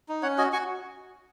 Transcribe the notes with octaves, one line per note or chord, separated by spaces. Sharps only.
D#4
C#4 C#5 F#5
F#4 D#5 G#5
F#4 G#5 C#6